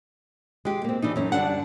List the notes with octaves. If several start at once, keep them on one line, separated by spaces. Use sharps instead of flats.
G#3 G4
A#3 C4
E3 D4 D#4
F#2 C#4
D3 G3 D4 F#5